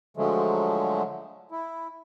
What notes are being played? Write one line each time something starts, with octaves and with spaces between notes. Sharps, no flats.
D3 F3 F#3 G#3 A3
E4